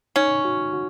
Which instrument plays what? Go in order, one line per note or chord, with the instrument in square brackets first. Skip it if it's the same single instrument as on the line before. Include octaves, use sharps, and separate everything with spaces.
[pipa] C#4 [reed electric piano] D#4
[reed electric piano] F#4
F#4